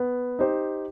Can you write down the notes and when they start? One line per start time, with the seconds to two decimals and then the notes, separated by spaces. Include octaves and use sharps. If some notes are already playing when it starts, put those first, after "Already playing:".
Already playing: B3
0.39 D#4 G4 C5